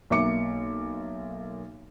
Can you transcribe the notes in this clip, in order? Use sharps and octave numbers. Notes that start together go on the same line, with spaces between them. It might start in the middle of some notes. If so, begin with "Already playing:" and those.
B1 A#3 E5 D6 C#7